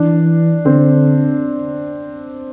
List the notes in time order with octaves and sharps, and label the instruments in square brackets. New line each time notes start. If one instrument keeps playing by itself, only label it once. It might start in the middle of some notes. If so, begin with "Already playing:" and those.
Already playing: [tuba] E3 [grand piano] D4
[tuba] D3 [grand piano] C4